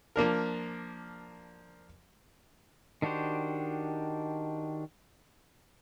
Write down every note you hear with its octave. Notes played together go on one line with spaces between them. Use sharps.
F3 A#3 D4 A#4
D#3 D4 F#4 G4 C5